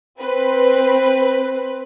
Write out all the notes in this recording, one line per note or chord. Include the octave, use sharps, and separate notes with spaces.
C4 B4